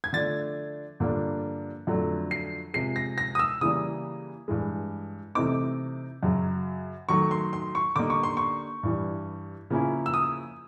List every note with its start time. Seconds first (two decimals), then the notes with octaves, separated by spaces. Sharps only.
0.04 G#6
0.13 D3 F3 A3 D4 A6
1.00 G2 D3 F3 A#3 D4
1.87 F2 D3 F#3 A3
2.31 C7
2.74 C3 F3 G#3 C7
2.96 A#6
3.18 A#6
3.35 D#6
3.39 E6
3.61 C#3 E3 G3 A#3 D#6
4.48 G2 E3 G#3
5.35 C3 E3 A3 C4 D#4 D6
6.23 F#2 C#3 F#3
7.09 D#3 F#3 A3 C#6
7.31 C6
7.53 C6
7.75 C#6
7.96 D3 G3 A#3 D#4 D6
8.10 C#6
8.23 C6
8.37 C#6
8.83 G2 E3 G3
9.70 C#3 F3 A#3 C#4 E4
10.06 E6
10.14 D#6